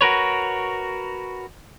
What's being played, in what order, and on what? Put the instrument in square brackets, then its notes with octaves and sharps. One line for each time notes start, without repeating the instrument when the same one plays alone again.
[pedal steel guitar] F#4 A#4 B4 C#5